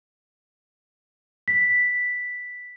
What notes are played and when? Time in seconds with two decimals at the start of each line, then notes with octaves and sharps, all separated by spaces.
1.48 B6